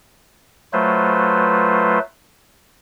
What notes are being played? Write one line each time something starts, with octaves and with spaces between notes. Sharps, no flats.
F#3 A3 F4 B4 C5